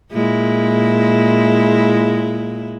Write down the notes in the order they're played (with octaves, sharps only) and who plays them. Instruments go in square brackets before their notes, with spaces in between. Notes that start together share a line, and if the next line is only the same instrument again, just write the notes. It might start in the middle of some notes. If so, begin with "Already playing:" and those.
[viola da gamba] A#2 G#3 E4